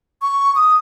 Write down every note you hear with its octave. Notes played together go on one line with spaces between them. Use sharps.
C#6
D#6